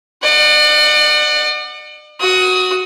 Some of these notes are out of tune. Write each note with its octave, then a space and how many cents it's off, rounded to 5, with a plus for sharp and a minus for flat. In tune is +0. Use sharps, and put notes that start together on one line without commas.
D5 +40 F#5 +0
F#4 +0 D#6 +25